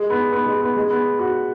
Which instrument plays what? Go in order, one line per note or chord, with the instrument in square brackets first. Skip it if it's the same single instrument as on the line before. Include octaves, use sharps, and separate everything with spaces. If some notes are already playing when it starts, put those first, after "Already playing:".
Already playing: [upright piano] G#3
B3
B3
G#3
B3
G#3
B3
F#4